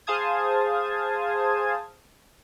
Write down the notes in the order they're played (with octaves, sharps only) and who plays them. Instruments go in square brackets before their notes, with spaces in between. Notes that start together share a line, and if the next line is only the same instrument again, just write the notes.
[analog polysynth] G#4 C5 F5 A5 D#6 G#6